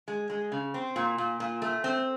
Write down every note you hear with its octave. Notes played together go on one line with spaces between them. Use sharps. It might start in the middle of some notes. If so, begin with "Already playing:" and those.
G#3
G#3
C#3
C4
A#2
A#2
A#2
A3
C4